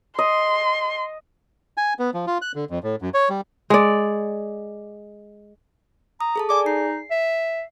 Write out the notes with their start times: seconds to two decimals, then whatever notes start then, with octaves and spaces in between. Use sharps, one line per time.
0.19 D#5 C6
1.77 G#5
1.99 B3
2.14 F3
2.27 F4
2.42 F#6
2.55 D3
2.70 F2
2.83 A2
3.02 F#2
3.14 C#5
3.29 G3
3.70 G#3 D5
6.21 A#5 D#6
6.36 G#4 A4 A5
6.49 G#4 D5 G#5 D6
6.66 D#4 C7
7.11 E5